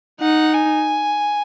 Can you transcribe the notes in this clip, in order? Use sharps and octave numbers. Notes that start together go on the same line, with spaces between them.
D#4 F#5
G#5